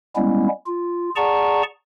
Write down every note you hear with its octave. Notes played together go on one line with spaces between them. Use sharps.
G3 G#3 B3 C#4 E4
F4
G#4 D5 F#5 A5 A#5 C#6